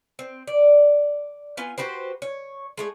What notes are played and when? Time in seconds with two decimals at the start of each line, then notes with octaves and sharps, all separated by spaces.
0.19 C4
0.47 D5
1.57 B3 F4 G#5
1.78 F#4 G4 B4 C5
2.22 C#5
2.78 G#3 A3 G#4